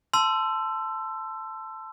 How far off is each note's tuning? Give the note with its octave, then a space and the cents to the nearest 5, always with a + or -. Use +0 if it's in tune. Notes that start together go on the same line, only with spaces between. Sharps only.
A5 +0 C6 -15 E6 +20